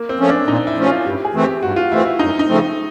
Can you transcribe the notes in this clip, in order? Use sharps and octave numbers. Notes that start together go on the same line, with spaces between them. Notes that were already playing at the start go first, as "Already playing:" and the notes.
Already playing: A#3
C4
F3 A3 C#4
D4
A#2 D#4
E4
F3 A3 C#4
F4
G2 G4
G#4
E3 A3 C4
G4
G2 F#4
F4
E3 A3 C4 E4
E4
F#2 D#4
D#4
C#3 F3 A3 C4